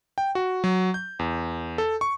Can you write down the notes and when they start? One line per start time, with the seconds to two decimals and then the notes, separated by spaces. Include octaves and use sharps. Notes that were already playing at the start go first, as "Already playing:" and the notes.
0.18 G5
0.35 F#4
0.64 F#3
0.94 G6
1.19 E2
1.78 A4
2.01 C#6